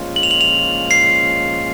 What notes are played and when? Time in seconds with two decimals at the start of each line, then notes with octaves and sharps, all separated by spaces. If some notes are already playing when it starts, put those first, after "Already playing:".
Already playing: A#2 F3 G#3 C#4 F4
0.16 F#7
0.23 F7
0.31 F#7
0.41 F7
0.91 C7